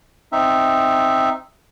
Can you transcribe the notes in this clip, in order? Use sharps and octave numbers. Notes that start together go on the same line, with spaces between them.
C4 D#4 E5